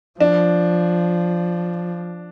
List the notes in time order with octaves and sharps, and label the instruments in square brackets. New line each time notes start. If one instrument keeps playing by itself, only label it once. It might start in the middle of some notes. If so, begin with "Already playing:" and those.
[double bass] F3 [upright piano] D4